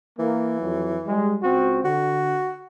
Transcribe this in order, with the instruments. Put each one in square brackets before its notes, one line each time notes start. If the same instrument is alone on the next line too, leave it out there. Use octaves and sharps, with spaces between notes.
[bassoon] E3 [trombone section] A#3
[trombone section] F2 F#3
G3 G#3
C#2 C4 F#4
[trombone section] D3 [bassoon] F#4